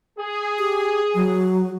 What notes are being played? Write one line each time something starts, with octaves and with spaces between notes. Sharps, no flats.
G#4
G4
F#3